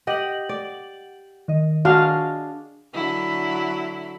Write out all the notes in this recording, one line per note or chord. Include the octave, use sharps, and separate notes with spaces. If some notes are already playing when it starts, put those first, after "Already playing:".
G4 D#5 F#5 F#7
D5
D#3 D#5
D4 F#4 G#4 F5
D3 F#3 E4